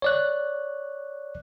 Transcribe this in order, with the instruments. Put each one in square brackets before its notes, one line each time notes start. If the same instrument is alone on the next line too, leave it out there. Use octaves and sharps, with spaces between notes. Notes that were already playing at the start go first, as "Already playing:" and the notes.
[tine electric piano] C#5 D5 F#6